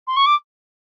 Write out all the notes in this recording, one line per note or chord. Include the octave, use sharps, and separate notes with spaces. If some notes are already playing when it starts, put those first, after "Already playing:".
C6
C#6
D6